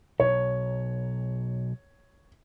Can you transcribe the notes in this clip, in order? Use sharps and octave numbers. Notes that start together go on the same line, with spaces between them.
B1 C#5